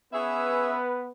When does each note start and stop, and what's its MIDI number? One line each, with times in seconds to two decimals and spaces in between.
0.13 1.11 59
0.13 0.76 61
0.13 0.76 68
0.13 1.06 71
0.13 0.76 76